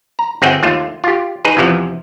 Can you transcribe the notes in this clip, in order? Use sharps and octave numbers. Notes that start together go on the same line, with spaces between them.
A#5
G1 C4 G#4 E5 F#5 G5
D#2 A3 F4
F4 G4
D#4 G#4 B4
E2 C3 E3 F3